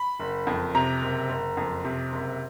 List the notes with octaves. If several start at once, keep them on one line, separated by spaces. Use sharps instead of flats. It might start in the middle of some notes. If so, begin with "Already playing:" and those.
Already playing: B5
F#1
F2
C3 A#5
F#1
F#1
F2
C3
F#1